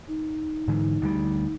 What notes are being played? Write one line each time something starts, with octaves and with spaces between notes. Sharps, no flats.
D#4
G#2 D3 E3
D2 F#3 G3